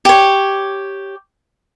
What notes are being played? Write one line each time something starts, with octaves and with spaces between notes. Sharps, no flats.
G4 C#5